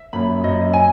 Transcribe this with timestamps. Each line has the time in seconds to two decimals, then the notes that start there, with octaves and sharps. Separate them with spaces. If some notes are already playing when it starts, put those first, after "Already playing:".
Already playing: E5
0.13 F#2 A#2 B5
0.44 F#2 A#2 D#5
0.73 G#5